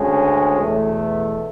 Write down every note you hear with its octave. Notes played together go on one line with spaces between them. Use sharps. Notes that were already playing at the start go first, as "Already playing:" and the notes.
Already playing: D2 C#3 G#3 C#4
E2 B2 A3